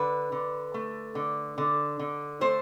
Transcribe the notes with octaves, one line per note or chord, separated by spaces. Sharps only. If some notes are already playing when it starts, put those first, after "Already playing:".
Already playing: D3 B4
D3
A3
D3
D3
D3
A3 C5